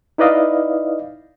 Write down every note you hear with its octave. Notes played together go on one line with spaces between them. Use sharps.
D#4 E4 B4 D5 D#5 F5